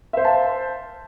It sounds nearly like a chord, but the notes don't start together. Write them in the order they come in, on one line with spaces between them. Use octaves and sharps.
E5 C5 F5 A5